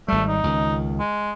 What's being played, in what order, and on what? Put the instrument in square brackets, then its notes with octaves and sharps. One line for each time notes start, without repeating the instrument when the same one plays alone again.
[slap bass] G#1 G3 [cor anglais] A3
[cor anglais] D#4
[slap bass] C#2 D#3
[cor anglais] G#3